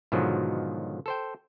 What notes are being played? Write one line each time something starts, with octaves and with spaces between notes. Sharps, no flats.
G#2 B2 D3 D#3 F3 F#3
A4 C5 G5